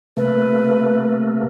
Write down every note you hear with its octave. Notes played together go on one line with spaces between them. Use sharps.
C3 A3 A#3 B4